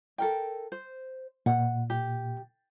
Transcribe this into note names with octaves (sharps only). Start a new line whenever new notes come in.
A4 A#4 G5
C5
A#2 F#5
G4